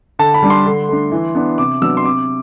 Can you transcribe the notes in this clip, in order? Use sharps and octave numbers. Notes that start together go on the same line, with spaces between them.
D3 A5
B5
G3 D4
C6
D3
A3 D4
E3
B3 D4
C3 D6
F#3 B3 D4 E6
C6
C3 D6